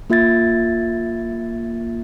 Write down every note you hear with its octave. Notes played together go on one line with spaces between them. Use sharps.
A#3 F4 E5 G#6 A6